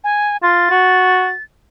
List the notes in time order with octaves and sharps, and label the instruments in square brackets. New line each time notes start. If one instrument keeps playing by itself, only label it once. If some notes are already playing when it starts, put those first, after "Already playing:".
[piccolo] G#5
[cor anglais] F4 [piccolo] A6
[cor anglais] F#4